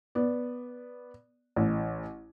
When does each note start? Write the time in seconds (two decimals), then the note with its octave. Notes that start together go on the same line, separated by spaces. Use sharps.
0.15 B3 D5
1.56 A1